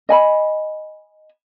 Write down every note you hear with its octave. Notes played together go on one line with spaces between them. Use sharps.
D#5 G#5 B5